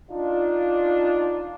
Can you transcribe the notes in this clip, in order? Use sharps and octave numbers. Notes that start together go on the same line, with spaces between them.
D4 D#4 F4